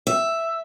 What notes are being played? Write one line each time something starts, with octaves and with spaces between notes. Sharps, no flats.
E5